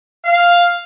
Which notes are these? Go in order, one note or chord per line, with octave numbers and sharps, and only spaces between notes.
F5